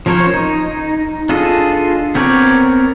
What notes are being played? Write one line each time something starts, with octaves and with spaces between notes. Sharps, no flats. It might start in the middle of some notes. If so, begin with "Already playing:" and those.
F3 C#4 A#4 C5 C#5
D#4
D4 F4 G#4 A4 D#5
B3 C4 A#4 C#5 D5